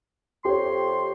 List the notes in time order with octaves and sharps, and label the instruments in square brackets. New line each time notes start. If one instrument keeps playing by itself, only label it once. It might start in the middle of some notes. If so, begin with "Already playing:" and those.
[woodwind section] F2 C6 [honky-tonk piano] G4 C#5